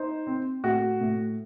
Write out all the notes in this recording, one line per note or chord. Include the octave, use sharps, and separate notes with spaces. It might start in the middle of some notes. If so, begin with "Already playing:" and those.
Already playing: D#4 C5
C4
A2 F#4
A2